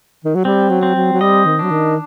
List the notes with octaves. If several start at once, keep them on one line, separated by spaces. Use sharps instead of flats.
D#3
F#3
G3 C4
F#3
C4
F#3
F#3
G3 D#5
D#3
F#3 D4
D#3